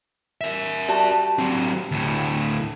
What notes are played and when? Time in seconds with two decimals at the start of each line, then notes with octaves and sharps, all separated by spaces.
0.41 A#4 E5
0.88 G3 F#4 A5
1.39 F#3 C4
1.91 D2 A2